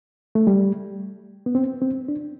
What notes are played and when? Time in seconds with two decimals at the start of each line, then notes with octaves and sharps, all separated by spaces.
0.35 A3
0.47 G3
1.46 B3
1.55 C4
1.81 C4
2.08 D4